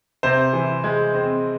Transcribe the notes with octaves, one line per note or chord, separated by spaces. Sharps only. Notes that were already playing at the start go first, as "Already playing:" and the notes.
C3 C5
E3
G#3
C4